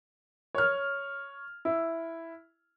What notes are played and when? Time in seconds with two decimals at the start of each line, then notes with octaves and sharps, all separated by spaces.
0.55 C#5 F6
1.65 E4